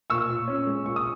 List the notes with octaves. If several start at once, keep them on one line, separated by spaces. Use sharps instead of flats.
A#2 C#6 E6
A#2
C#4
G#3
A#2 C#6
D#6